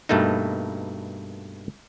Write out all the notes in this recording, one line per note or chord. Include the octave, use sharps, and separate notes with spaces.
G2 B2 A3 A#3 D#4